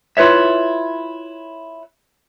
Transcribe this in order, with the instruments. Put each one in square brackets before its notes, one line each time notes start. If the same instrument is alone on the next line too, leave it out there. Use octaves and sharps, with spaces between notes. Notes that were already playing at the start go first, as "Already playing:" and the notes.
[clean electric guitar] E4 F4 B4 C#5 E5